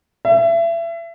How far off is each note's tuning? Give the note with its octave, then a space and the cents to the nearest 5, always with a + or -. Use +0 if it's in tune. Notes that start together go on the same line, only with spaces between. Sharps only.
E5 +30